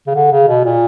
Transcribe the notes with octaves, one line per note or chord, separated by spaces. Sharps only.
C#3
D3
C#3
B2
A#2